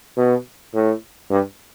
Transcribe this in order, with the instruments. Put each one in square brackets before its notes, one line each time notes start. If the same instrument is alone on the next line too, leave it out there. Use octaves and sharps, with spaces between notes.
[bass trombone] B2
A2
G2